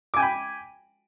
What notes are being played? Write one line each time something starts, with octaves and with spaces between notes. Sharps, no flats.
G5 G#5 B5 D6